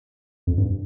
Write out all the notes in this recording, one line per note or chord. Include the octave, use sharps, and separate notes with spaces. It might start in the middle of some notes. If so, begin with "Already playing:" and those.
F2
G2